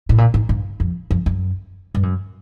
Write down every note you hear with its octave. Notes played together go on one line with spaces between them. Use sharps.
A2
A#2
G#2
G2
F2
F2
F#2
G2
F#2